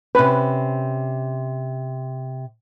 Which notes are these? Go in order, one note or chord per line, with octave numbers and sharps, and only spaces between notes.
C3 C#4 B4